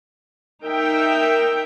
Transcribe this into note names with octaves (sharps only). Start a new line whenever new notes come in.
D#4 A#4 E5 G5